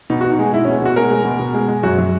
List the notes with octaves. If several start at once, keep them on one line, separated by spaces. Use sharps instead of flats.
B2 D#4
F#4
B2
D#4
G#3 G#4
G#3 E4
C#4
B2
B2 F#4
G#3 A#4
G#3
B2
B2
G#3
G#3
F#2 F#4
F#3